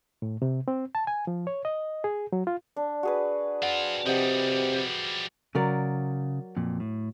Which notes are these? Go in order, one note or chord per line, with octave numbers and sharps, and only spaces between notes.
A2
C3
C4
A5
G#5
F3
C#5
D#5
G#4
F#3
F4
D4
F#4 G#4 B4
C4 F4 F#5
C3 F3 G3 D#5 F#5
C#3 F#3 A#4 D5
F2 A#2
A2